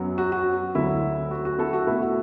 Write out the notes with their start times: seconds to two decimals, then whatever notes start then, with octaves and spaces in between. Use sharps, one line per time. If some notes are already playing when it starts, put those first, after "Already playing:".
Already playing: F#2 F#3 B3
0.18 F#4
0.32 F#4
0.75 D2 D3 F#3 E4
1.31 F#4
1.45 F#4
1.59 E4 A4
1.73 F#4
1.87 B2 A3 E4
2.02 F#4